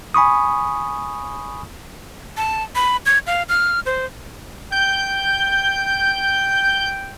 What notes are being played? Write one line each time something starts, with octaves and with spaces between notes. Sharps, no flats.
G#5 B5 C#6 D#6
A5
B5
G#6
F5
F6
C5
G5 G6